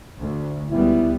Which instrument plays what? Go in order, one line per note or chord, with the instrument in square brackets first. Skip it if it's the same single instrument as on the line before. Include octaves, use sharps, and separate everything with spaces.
[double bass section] D2
[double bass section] C#2 G3 B3 [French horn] E4